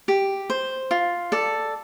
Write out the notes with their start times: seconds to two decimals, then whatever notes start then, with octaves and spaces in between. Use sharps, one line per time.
0.08 G4
0.50 C5
0.91 F4
1.32 A4 D5